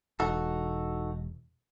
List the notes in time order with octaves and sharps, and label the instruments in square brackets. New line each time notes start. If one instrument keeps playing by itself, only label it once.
[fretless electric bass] E1 [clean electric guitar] D#4 F#4 A4